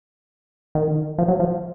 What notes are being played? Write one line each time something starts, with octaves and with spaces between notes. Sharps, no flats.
D#3
F3
F#3
F3